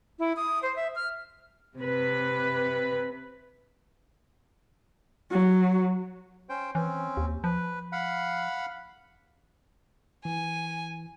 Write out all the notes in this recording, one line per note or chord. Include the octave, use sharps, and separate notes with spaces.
E4
D#6
C5
E5
F6
C3 B4
F#3
C#4 C5 G5
E3 C4 C#4
D#2
F3 B4
F5 F#5 B5
E3 G#5